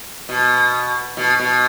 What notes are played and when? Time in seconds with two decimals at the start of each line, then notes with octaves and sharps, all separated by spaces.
0.29 B2
1.17 B2
1.40 B2